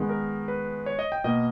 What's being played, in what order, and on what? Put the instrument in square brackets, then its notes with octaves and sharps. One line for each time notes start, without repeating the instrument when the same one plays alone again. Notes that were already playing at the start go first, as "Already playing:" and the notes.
Already playing: [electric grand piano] D#3 G#3 B3
A#4
B4
C#5
D#5
G5
B2 A#3 D#5